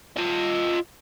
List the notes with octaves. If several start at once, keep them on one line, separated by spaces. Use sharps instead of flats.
F4 D#5